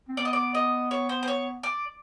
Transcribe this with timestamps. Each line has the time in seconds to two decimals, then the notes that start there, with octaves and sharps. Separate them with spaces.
0.09 C4
0.17 B3 D5
0.25 D#5
0.33 D5
0.55 D#5
0.91 C#5
1.09 C5
1.23 C5
1.28 C#5
1.63 D5